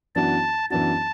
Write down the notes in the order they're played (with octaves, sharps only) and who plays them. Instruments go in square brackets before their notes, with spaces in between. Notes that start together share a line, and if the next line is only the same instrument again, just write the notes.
[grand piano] F#2 E3 B3 D4 F#4 [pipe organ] A5
[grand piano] F#2 E3 B3 D4 F#4 [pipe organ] A5